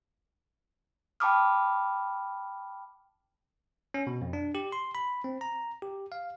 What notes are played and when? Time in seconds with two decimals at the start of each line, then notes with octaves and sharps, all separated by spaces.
1.20 G5 A5 B5 D6 D#6 F6
3.94 C#4
4.07 B2
4.22 F2
4.33 D4
4.55 G4
4.72 C6
4.95 B5
5.24 C4
5.41 A#5
5.82 G4
6.12 F5